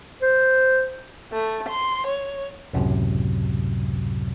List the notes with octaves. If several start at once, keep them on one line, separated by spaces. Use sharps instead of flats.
C5
A3
C6
C#5
C#2 F#2 A2 C3 F#3